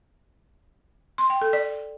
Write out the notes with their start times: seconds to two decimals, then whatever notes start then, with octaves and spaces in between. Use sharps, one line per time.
1.18 C6
1.30 G5
1.41 A4
1.53 D5